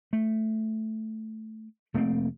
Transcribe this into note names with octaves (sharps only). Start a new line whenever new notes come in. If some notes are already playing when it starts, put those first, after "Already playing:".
A3
F1 A3 A#3 C4